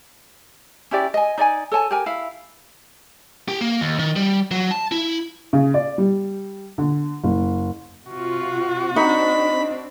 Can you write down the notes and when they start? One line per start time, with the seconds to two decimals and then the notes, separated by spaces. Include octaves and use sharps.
0.91 C#4 E4 G4 D5
1.14 D#5 G#5
1.38 D#4 D5 D#5 G#5
1.71 A4 C#5 G#5 A5
1.91 G4 A#4 G#5
2.06 E4 F5
3.48 G4
3.61 A#3
3.80 D#2
3.99 D#3
4.16 G3
4.51 F#3
4.71 A5
4.92 E4
5.53 C#3
5.74 D5
5.98 G3
6.78 D3
7.24 F#1
8.09 C3 F4 F#4
8.96 C4 D4 D#4 B5